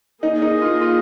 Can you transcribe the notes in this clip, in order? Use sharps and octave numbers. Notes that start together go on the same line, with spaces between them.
A#3 D#4 G#4 D#5
D#4
F4
F4